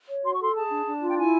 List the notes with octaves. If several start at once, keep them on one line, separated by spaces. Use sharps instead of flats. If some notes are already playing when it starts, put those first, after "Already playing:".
C#5
F#4 C6
C#6
A4 C6
G#4 A5
D4
D4
F4
G5
E4 G#5